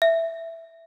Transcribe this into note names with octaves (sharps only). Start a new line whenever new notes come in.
E5